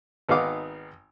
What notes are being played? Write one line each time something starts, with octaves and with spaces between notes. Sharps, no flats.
G#1 B3 D#4 F5 D6 D#6